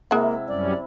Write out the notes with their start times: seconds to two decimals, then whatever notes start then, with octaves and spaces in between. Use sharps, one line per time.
0.11 C3 G#3 A#3 E4 F#5
0.48 F#2 G3 C#4 D5